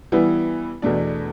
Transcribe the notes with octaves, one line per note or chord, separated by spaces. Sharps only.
E3 G3 B3 E4
E2 B2 A3 D4